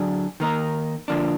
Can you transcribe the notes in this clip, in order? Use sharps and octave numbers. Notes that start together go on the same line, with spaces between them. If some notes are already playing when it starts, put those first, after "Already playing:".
Already playing: D3 F#3 D4 G#4
D#3 A#3 D#4 A#4
D3 F3 A#3 D4